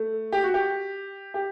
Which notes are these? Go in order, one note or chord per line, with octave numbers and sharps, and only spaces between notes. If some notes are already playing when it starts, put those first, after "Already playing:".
Already playing: A3
G4
F#4
G4
G4